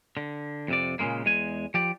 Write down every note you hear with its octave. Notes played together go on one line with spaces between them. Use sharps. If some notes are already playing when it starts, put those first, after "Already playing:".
D3
F2 C3 D5
A#2 C#3 E3 G#3 A#3
E2 G#3 G#5
F3 G4 D5